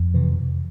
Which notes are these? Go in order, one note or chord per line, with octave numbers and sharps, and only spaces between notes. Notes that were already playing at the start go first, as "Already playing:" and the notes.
Already playing: F2
C3 E3